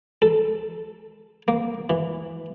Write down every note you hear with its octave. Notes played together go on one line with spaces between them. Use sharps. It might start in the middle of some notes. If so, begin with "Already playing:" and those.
A4
A#3
E3